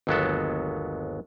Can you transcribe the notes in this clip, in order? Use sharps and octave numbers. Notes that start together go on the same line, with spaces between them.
G1 D#2 F#3 G#3 B3 A4